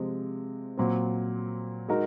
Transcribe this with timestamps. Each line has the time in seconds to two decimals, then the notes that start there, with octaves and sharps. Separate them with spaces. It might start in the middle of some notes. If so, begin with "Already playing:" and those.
Already playing: C3 F3 G#3
0.77 A#2 F#3 C4
1.89 G#3 D#4 F#4 A#4